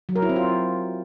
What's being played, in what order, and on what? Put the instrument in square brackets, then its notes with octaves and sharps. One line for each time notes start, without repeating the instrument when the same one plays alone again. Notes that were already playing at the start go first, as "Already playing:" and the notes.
[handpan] F#3
A#4
E4
C4
F4